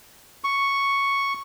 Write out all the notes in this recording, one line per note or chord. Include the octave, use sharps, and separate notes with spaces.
C#6